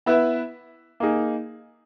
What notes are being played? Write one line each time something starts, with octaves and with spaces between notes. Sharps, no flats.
B3 E4 B4 E5
A#3 D#4 G#4